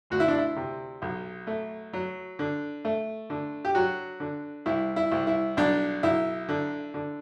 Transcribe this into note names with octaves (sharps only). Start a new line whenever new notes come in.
D2 F#4
E4
D4
E4
C3
B1
A3
F#3
D3
A3
D3
G4
F#3 F#4
D3
C2 E4
E4
C2
E4
B1 D4
B1 E4
D3
D3